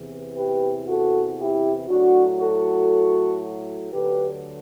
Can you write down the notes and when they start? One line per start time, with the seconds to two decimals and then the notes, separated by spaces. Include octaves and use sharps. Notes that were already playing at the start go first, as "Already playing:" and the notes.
Already playing: E2 C3 E3
0.36 G4 B4
0.88 F#4 A4
1.39 E4 G4
1.88 A2 F#3 D4 F#4
2.40 F#4 A4
3.92 D2 D3 F#3 G4 B4